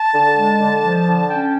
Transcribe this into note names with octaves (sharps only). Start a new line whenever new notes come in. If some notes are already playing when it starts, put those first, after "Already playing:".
Already playing: A5
D3
G#3
D3
F3
D3
C#4 G5